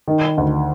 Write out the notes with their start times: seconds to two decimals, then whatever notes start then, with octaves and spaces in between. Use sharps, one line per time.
0.08 D#3
0.38 D2